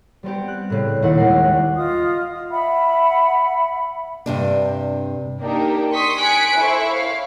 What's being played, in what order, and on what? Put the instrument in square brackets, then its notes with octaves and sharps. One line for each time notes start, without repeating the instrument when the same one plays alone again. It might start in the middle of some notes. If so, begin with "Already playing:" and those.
[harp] G3 B3 C4 G4
F#6
A2 C#3 G3
D#2 A#2 D#3 E4 D#5 F#5
D#3 G#3 C7
G3
[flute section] F4 D#5 D#6
E5 F#5 B5
[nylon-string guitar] G2 C3 D4
[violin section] A#3 D4 D#4 G4 A#4
C6 C#6 D#6 B6
G#5 F#6 B6 C#7 D7
E4 A4 C5 C#6
C#5 F5